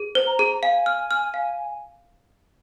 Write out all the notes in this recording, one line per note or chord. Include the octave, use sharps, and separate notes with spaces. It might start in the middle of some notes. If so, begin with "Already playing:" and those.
Already playing: G#4
C5
A#5
G#4
F5 G#5
F6
F6
F5